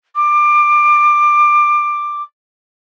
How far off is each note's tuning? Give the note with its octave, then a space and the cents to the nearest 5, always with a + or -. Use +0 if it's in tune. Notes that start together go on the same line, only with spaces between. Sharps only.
D6 +20